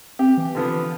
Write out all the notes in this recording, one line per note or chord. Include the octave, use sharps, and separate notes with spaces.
C4 G4
E3
D3 F3 B3